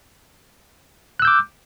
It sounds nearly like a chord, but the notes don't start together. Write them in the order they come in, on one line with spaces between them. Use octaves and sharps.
F#6 E6 G6 D6